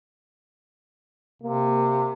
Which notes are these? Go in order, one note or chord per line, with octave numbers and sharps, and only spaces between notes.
C3 A#3